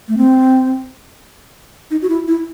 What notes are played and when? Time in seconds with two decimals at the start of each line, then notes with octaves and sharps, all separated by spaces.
0.08 A3
0.17 C4
1.91 D#4
2.02 F#4
2.09 E4
2.28 E4